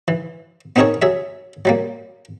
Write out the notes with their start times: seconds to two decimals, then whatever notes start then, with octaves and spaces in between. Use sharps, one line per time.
0.08 E3
0.76 B3 C4 D#4 G#4 A#4 C#5
1.02 F#3 G#4 E5
1.65 F#3 G3 A#3